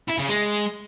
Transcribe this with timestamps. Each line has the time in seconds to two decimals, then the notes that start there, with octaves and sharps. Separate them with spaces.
0.08 E4
0.18 C#3
0.28 G#3